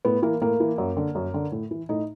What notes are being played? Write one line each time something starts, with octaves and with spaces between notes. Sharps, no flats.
A2 B3
E3 A#3
A2 A#3
E3
F#2
D3
F#2
D3
A2
E3
A2 D#4